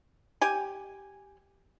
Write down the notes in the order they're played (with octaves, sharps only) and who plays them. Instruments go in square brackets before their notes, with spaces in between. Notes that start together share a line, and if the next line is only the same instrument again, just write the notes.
[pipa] G4 G#5